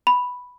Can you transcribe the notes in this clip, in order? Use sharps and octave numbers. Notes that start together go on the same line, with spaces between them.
B5